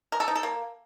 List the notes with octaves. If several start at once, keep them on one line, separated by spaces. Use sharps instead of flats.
A#4
A4
D#4
A4
A#3